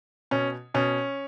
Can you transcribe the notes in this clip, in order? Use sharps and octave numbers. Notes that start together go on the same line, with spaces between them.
B2 C#4
B2 C#4